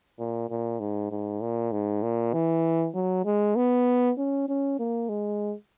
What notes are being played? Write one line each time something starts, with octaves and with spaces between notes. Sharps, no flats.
A#2
A#2
G#2
G#2
A#2
G#2
A#2
E3
F#3
G#3
B3
C#4
C#4
A#3
G#3